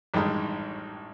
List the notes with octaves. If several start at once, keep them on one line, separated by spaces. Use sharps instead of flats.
A1 G2 D#3 G#3